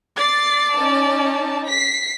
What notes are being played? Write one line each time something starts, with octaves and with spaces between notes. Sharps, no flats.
D5 A6 C7
C#4 D#4 A5
B6 C7